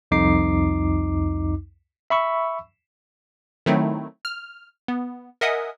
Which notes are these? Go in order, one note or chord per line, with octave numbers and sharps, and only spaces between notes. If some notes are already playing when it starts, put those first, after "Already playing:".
C2 F2 D#4 D6 C7
E5 B5 C#6 E6
D#3 F#3 A3 C4 D#4 E4
F6
B3
A#4 D#5 E5 F#5 G#5 D#6